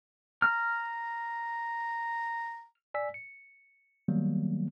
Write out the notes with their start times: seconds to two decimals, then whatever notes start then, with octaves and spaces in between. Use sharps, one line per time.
0.42 A#5 F6
2.94 D5 G#5 E6 B6
3.14 C#7
4.08 D#3 F#3 G3 A#3 B3